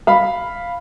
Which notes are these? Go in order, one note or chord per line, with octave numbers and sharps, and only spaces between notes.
F5 B5